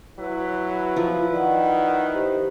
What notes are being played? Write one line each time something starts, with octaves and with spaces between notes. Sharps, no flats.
F#3 E4 B4
F3
D#3 D5 F#5
G4 C5